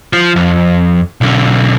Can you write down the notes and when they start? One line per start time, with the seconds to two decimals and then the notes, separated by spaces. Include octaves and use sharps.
0.13 F3
0.36 F2
1.21 B1 D3